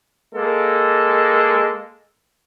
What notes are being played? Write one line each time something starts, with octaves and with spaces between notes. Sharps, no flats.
G#3 A#3 A4